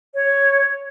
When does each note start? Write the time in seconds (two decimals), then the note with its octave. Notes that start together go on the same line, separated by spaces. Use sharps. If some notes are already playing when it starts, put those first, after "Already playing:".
0.15 C#5